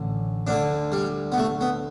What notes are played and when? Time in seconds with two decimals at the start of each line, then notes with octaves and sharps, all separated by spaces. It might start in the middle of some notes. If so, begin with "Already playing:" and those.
Already playing: A1 D3
0.47 D2 D3 D4
0.92 G3
1.32 B3
1.38 A3
1.61 B3